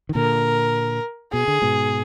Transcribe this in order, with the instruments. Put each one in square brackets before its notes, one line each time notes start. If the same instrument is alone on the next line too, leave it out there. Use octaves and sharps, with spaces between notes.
[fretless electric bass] D#3
[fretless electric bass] A#2 D3 [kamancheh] A#4
[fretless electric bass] B2 [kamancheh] G#4
[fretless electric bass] D3
G#2 B2